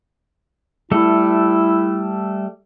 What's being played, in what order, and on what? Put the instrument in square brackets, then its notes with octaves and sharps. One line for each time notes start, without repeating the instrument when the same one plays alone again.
[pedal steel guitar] G3 A3 A4 [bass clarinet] E4